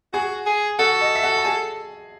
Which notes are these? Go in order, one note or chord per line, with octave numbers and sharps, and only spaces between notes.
F#4 G#4 G#5
G#4
F#4 A4 F#5
D#5
E5
F#4 F#5
A5
G#4 G#5